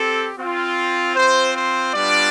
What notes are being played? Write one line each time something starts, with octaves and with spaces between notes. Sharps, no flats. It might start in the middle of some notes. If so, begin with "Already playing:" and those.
Already playing: C4 G4 A4
C4 F4
C4 F4 C5
C5
G3 B3 D4 F4 D5